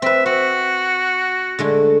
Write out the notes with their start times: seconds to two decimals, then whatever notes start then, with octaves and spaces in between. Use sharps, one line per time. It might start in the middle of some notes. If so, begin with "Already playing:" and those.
0.02 C4 B4 E5
0.26 C4 F#4
1.59 D3 G#3 A3